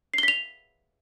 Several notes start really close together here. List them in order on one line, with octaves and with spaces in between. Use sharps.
C7 G7 B6 F7